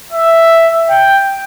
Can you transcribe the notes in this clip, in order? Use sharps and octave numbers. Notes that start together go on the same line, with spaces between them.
E5
G5